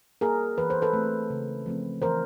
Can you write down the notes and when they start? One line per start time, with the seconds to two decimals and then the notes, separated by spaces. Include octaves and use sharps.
0.21 G3 A#3 G#4 A#4
0.58 E3 B4
0.70 C5
0.82 A4 B4
0.93 A3 C4
1.30 C#3
1.66 F3 A3 C4
2.02 E3 A#4 C5